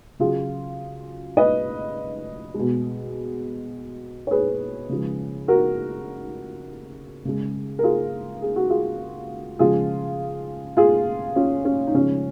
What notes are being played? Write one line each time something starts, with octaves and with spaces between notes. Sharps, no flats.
C#3 F#3 F4 G#4
B4 D#5
G#3
B2
C#5
G#4 B4
C#3 F3 G#3
F#4 A#4
C#3 G#3
A#4
F4 G#4
G#4
F#4
F4 G#4
C#3 F3 G#3 F4 G#4
F4 G#4
C#4 F4
C#4
D#4
C#3 F3 G#3 C#4